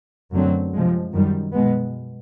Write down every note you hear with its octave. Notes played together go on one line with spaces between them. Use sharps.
F#2 D3 F#3 A3 C4
C3 F3 G#3
F#2 D#3 G3
B2 G#3 B3